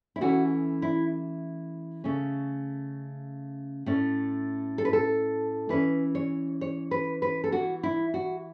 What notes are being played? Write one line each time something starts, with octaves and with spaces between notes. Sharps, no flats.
E4
E3 A3 C#4 F#4
E4
C#3 A3 C#4
A2 A3 C#4
A4
B4
A4
E3 C#4 B4
C#5
C#5
B4
B4
A4
E3 B3 F#4
E4
F#4